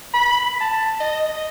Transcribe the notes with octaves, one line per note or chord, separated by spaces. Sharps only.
B5
A5
D#5